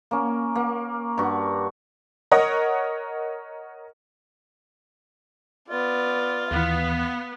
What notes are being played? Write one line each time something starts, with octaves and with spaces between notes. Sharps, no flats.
A#3 C#4
A#3
G2 F#4
A#4 C#5 D#5 F#5
B3 F4 D5
D#2 E3 B3 F5